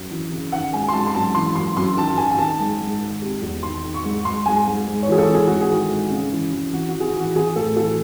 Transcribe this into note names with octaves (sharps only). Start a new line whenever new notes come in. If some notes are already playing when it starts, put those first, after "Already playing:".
Already playing: F#2
E3
C#3
D#3 F#5
G#2 G#5
C6
G#2 A5
C6
F#2 A5
E3 C6
F#2 C6
F#2 C6
D#3 A5
D#3 G#5
G#5
D#3 A5
G#2
G#2
D#3
C3
E2
D#3 C6
D#3
C#6
G#2
G#2 C6
G#2 G#5
G#2
G#2
C#5
E3 G#4
A4
E3
G#4
G#2 F#4
G#4
D#3
G#2
C#3
E3
E3
E3 F#4
F#4
E3
G#4
F#4
E3
F#4
E3 G#4
A2 A4
E3 A4